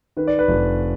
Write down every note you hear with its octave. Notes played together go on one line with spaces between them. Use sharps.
D#3 B4
D5
B4
F1